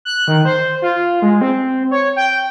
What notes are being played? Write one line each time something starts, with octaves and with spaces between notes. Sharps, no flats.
F#6
D#3
C5
F4
G#3
C4
C#5
G5